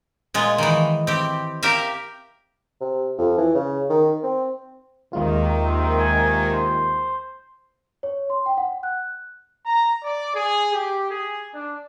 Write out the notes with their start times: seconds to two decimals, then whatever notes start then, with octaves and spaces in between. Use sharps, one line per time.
0.34 A#2 G#3 F4
0.58 D#3 E3
1.07 C4 G4
1.63 G4 A#4 E5 F5
2.81 C3
3.19 F2
3.38 E3
3.55 C#3
3.90 D#3
4.23 C4
5.13 D#2 C3 D#3 G#3 A#3 F4
5.65 C4
6.00 G#5
6.52 C5
8.03 C#5
8.30 C6
8.46 G5
8.57 F#5
8.83 F#6
9.64 A#5
10.03 D5
10.33 G#4
10.72 G4
11.10 G#4
11.53 D4